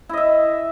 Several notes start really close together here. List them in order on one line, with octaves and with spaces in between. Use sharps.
E4 D#5 E5